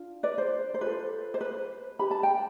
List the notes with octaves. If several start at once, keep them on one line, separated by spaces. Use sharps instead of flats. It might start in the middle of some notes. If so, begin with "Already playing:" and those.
Already playing: D4 F4
B4 D5
C5
C5
F4 A4 B4
C5
B4
D4 G4 B4 B5
A5
G5